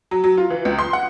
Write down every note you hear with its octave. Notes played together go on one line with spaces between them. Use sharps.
F#3
F#3
F4
E3
C#2
C6
F#5